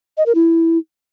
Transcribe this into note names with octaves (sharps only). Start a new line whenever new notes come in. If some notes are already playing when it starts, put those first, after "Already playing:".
D#5
A#4
E4